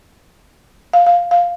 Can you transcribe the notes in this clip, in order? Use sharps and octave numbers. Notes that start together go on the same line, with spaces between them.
F5
F5
F5